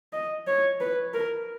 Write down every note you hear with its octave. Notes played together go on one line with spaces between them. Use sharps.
D#5
C#5
B4
A#4